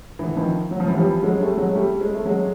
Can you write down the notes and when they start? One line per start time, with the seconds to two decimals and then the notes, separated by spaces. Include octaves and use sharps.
0.19 D3 E3
0.37 D#3 F3
0.71 F#3
0.80 F3
0.88 E3 F#3
0.97 F3 G3
1.23 F#3 G#3
1.41 G3 A3
1.57 F#3 G#3
1.74 G3 A3
2.01 G#3
2.13 A3
2.25 F#3 G#3